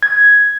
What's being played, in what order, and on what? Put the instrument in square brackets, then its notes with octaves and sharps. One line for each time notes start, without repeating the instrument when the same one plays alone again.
[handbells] G#6